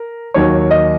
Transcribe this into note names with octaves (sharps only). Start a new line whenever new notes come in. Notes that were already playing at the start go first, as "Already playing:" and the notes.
Already playing: A#4
D#2 D#3 F#3 C#5
D#5